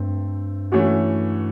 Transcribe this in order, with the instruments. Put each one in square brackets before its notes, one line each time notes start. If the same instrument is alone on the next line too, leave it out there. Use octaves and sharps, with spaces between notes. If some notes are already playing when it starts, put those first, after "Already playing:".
Already playing: [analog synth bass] G2 [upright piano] A3 C4
[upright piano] E3 A3 C#4 F#4